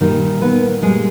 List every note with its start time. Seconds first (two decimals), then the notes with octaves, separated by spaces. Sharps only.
0.01 A#2 D#3 G3 D#4
0.42 B3 B4
0.82 A#2 G3 G#3 G#4